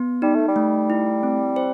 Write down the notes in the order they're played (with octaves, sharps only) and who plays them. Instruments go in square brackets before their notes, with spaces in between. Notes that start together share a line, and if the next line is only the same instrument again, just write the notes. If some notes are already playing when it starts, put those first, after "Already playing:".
Already playing: [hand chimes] B3
[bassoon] G3 [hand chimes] D#4
[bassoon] A3
G3
[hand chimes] A3
E4
C4
C5